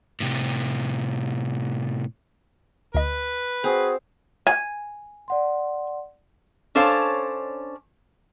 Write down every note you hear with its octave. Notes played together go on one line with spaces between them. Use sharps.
A2 C3
D2 B4 D#5
C4 F#4 G#4
G#5
D5 F#5 C6
C#4 D4 A4 C5 C#5 F5